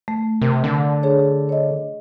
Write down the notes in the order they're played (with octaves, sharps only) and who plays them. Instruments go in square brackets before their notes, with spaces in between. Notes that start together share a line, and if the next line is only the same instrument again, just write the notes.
[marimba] A3
[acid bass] C3 [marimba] A#4
[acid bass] D3
[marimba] D4 G#4 C#5
C#5 D#5